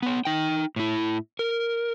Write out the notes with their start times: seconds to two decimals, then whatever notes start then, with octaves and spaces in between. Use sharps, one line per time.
0.03 B3 C#5
0.25 D#4 G5
0.76 A2 E4
1.39 A#4